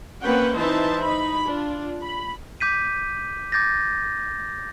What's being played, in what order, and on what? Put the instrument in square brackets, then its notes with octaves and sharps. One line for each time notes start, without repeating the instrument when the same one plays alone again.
[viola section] A#3 C4 C#4 B4 F#5 G5
E3 D#4 C5 E5 A5
D#4 B5
D4 F4
B5
[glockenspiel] D6 G6 B6 D#7
D6 G6 A6 A#6